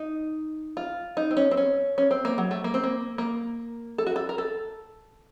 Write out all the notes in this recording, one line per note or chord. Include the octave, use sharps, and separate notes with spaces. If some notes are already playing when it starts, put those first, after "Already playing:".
Already playing: D#4
F4
D#4
C4
C#4
C4
C#4
C#4
C4
A#3
F#3
A3
A#3
C4
A#3
A#3
A4
F#4
A4
A#4
A4